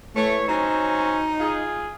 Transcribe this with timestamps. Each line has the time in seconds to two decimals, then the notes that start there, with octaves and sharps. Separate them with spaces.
0.16 E3 A3 C#5
0.48 F#3 C4 C#4 D#4
1.40 F4 G#4